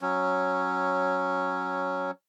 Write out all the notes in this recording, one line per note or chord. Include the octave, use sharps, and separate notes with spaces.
F#3 C#4